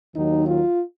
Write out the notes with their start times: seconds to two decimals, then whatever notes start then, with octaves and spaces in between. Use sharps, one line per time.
0.15 D#2 D#3 F#3 D#4
0.47 F4